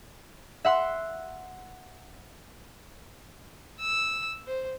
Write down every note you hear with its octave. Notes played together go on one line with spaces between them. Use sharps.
E5 F#5 C6 E6
E6
C5